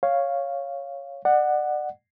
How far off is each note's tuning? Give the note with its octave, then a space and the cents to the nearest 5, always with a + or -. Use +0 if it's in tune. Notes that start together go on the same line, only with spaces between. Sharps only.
C#5 +0 F5 +0
D5 +35 F#5 +0